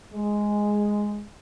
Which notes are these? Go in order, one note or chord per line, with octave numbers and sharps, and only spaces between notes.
G#3